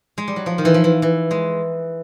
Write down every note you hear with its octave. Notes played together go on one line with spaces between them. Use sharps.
G#3
G3
F#3
F3
D#3
E3
F3
E3
E3
G#3